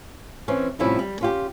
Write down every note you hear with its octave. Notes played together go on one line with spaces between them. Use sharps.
E3 C4 C#4
A2 C3 F3 G3 C#4 E4
G3
C#4 F4 G4